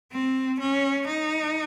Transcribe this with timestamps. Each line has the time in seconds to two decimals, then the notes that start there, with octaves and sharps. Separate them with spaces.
0.12 C4
0.59 C#4
1.07 D#4